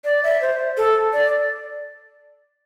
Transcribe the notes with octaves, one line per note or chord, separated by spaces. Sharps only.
D5
E5
C5
A4
D5